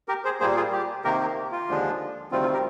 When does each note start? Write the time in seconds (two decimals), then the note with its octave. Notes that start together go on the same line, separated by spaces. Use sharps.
0.08 G4 A#4
0.25 G#4 C5
0.40 A#2 G3 A#3 G#4 C5
0.57 F4 G#4
0.73 G4
1.04 C3 D#3 A#3 G4 A#4
1.20 G4
1.52 F4
1.68 D#2 D3 F3 G#3 D4
2.32 D2 C3 D#3 G3 C4 F4
2.42 F4
2.53 G4 A#4